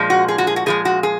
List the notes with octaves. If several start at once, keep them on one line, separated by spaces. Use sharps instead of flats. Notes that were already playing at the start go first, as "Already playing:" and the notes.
Already playing: A#2 F3 G#3
F#4
G#4
F#4
G#4
F#4
A#2 F3 G#3 G#4
F#4
G#4